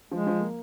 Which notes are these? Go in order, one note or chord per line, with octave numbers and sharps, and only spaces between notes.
F3 G#3
F3
A#3